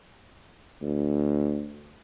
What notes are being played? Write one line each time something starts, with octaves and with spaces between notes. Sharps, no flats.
D2